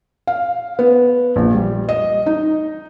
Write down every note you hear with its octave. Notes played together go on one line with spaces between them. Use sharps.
F5
B3
A#1
G3
D#5
D#4